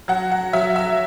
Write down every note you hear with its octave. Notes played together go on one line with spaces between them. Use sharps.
F#3 F#5
F#5
F#3 E5
E5